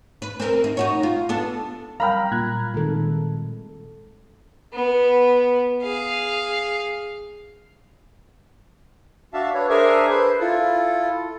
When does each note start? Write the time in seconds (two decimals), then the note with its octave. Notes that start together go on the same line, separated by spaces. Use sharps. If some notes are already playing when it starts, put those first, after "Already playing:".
0.22 B4
0.40 C4 A#4
0.64 D#4
0.77 D#4 F#4 C#5
1.03 F4
1.29 B3 D4 A4
2.00 F#3 G3 A#4 F5 G5 A#5 B5 F6
2.32 A#2 F4 F#6 G#6
2.74 A#2 D#3 G#3 C4 A4
4.73 B3
5.83 G#4 F5
9.33 D4 F#4 E5 F5 A5
9.54 D4 B4 C#5
9.70 D4 G#4 A#4 C5 E5 G#5
10.10 B4 C5
10.40 E4 F4 A4